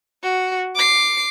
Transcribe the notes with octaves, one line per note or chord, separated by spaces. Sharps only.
F#4
D6 C7